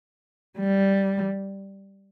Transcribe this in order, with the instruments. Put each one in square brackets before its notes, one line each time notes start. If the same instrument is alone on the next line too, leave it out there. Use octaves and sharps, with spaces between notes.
[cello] G3